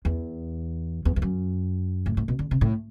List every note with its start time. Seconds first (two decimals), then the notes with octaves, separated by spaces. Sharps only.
0.05 E2
1.05 E2
1.16 E2
1.22 F#2
2.06 A2
2.17 A2
2.28 B2
2.39 D3
2.51 C3
2.61 A2